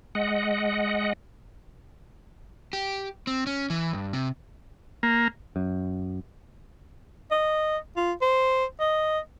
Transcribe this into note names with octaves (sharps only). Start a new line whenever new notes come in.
G#3 D#5 F#5
G4
C4
C#4
E3
G2
C3
A#3
F#2
D#5
F4
C5
D#5